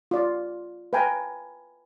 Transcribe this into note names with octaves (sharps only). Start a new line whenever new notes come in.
F4 D5
B4 F5 G5 G#5 A#5